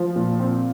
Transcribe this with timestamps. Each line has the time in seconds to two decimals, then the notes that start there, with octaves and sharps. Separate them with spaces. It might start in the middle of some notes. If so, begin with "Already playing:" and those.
Already playing: F3
0.16 A#2
0.40 C4